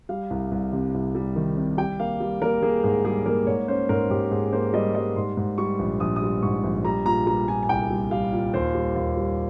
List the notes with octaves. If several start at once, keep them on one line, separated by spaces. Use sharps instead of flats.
G3 F5
C2
C2
C3
C2
G3
D#3
C3
G3 G5
A#3 F5
G3
A#3 A#4
A#3 G#4
G#2 G#4
G3 G#4
A#3 A#4
G#2 C#5
C#4 C5
G#2 A#4
G#2 G4
G#2 G#4
A#3 C5
G3 D#5
G3 D#5
G#2 C6
G#2
G3 C#6
A#1
A#1 D#6
D#6
G3
G#2 C#6
A#1
G3 A#5
A#2 A#5
G3 A#5
A#2 G#5
G#5
C2 G5
G3
G3 F5
A#2
D#2 C5
G3
D#2
G3